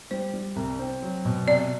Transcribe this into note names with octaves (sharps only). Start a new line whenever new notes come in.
G3 C5
G3
C2
C4
F#3
B2
C3 D5